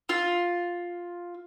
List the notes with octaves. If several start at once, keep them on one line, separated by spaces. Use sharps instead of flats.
F4